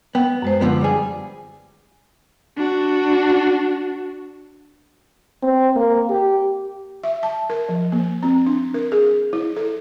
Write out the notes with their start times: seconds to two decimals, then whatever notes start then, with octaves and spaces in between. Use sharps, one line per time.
0.15 B3 G5
0.42 F#2 G#3 C5
0.61 D3 F3 B3
0.81 G3 G#4
2.57 D4 F#4
5.43 C4
5.76 A#3
6.10 G4
7.03 E5
7.23 A5
7.50 A#4
7.69 F3
7.92 A#3
8.23 C4
8.46 D4
8.74 A#4
8.92 G#4
9.33 E4
9.57 A4